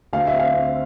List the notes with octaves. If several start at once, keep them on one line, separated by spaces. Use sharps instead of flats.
D2 F5
E5
C4
F5
C4